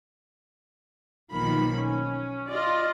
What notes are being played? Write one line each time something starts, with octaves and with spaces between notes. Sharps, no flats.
B1 D#3 F3 A#3 B5
C#4
F4 D5 D#5